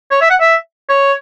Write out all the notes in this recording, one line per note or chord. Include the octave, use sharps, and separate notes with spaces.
C#5
E5
F#5
E5
C#5